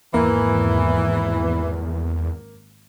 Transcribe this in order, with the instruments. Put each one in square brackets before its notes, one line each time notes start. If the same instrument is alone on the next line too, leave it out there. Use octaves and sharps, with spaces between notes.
[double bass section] G#1 [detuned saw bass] E2 [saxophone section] E3 [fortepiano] A#3